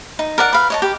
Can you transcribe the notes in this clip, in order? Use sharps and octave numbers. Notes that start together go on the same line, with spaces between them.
D#4
A#4 D5 F#5
B4 F5
C#5 D#5 A5
G4